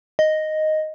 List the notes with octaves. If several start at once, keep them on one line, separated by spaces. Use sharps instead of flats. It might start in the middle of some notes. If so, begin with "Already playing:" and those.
D#5